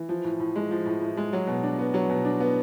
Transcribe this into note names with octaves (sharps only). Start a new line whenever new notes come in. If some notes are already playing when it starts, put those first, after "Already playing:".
Already playing: E3
F3
A2
A2
G#3
F3
A2
A2
G#3
F#3
B2
D4
B3
F#3
B2
D4
B3